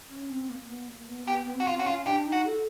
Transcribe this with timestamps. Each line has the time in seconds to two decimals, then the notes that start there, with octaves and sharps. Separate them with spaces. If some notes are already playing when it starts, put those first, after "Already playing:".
0.10 C#4
0.29 C4
0.50 A#3
0.69 B3
0.88 A#3
1.09 B3
1.27 B3 G4
1.45 B3
1.54 C4
1.60 F#4
1.67 F4
1.75 C4
1.79 C#4 F#4
1.86 F4
2.05 D4 G4
2.26 D#4
2.32 F#4
2.45 A4